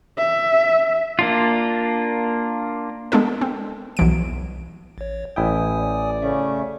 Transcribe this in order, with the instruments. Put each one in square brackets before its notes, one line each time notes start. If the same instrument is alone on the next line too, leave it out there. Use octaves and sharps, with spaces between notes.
[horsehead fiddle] E5
[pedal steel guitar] A#3 D4 F4
[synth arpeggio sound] G#3 B3 D4 A4 A#4
C4
B1 E3 D7
[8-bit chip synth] A1 C#5
[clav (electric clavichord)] A1 E4 G5 [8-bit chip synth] G#5 D#6
[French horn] D5
[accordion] C#3 A3 C#4 [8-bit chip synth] E5